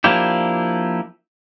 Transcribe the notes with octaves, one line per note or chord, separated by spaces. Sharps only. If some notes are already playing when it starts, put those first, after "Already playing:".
F3 A#3 D4 E4 G4